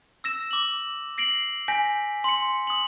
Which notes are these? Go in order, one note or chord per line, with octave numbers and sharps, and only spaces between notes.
E6 A#6 E7
D6 F#7
A#6 C7 D7 F#7
G#5 G6 A#6 B6
C6 C#7
D#6 F#7